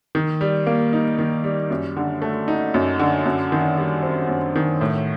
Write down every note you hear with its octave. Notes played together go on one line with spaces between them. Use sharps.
D#3
G3
A#3
D#4
D#3
G3
F#2
D3
A3
D#4
F#2
D3
F#2
D#3
G3
C4
F#2
D#3
A2